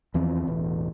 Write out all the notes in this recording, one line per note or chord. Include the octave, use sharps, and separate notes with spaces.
E2 E3 F3 C4
E1 A1 E3